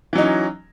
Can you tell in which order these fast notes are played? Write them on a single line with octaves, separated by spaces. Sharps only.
E3 F#3 D#4 C#4